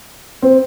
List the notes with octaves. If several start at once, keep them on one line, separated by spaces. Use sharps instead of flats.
C4